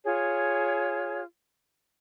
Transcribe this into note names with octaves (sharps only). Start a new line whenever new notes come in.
F4 G#4 C#5